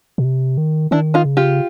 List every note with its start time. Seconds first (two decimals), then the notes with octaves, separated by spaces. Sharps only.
0.18 B2
0.24 C3
0.58 D#3
0.91 D#3 D4 E4
1.14 D#4 F4
1.25 C#3
1.37 F4 G4